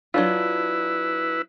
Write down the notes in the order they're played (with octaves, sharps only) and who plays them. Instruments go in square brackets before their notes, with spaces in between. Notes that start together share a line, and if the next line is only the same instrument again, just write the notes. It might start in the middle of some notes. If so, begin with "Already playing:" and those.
[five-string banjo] F#3 D4 F4 [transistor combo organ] E4 B4